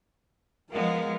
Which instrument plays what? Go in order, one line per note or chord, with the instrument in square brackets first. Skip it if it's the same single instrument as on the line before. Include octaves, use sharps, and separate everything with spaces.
[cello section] F3 G#3 B3 [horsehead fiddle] A#4 F5